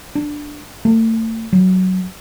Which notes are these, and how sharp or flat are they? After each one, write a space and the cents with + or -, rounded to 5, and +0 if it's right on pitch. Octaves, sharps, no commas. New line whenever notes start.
D4 +5
A3 +40
F#3 +10